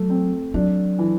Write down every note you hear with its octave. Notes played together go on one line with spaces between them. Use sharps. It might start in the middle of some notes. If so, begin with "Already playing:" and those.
Already playing: F#3 A3
C4
F#3 D4
E3